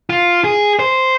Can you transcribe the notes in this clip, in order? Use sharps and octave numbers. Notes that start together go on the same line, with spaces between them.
F4
G#4
C5